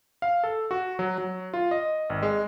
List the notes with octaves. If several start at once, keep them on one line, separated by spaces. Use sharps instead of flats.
F5
A4
F#4
F#3
F#3
F4
D#5
G#1
G#3